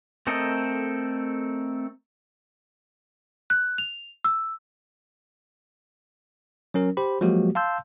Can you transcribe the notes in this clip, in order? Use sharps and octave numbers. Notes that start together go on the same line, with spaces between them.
A3 C4 A4 A#4 D#5
F#6
F7
E6
F#3 C#4 A#4
G4 C5 B5
F3 F#3 G#3 A#3 F#4 G4
F5 A5 C6 E6 G6